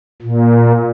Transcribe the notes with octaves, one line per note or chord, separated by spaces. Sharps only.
A#2